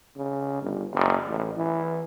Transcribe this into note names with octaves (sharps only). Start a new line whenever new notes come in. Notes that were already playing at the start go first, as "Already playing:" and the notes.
C#3
G1
F#1
A1
E3